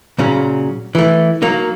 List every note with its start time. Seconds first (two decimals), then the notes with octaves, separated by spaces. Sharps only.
0.19 A#2 C#3 F#3
0.95 E3 A3
1.42 F#3 A#3 D#4